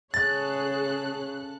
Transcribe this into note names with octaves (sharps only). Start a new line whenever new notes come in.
C#3 G#4 A4 C#5 F#6 A6